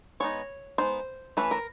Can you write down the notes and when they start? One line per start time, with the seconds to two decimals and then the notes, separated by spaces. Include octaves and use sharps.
0.20 G#3 B3 D#4 C#5
0.78 G#3 B3 D#4 C5
1.37 E3 A3 C#4 B4
1.51 A#4